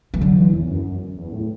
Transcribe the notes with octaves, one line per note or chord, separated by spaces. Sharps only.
E3
D3 F#3
E3
E2
F#2
E2
A2